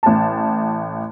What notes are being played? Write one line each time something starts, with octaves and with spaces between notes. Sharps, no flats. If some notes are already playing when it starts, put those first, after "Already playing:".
A1 A5